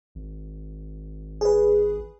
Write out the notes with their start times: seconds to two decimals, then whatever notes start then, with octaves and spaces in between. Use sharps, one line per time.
0.15 G#1
1.41 G#4 B4